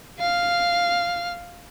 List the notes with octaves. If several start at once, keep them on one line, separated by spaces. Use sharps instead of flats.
F5 F6